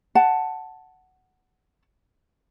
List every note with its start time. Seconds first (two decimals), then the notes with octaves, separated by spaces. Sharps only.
0.15 F#5 A5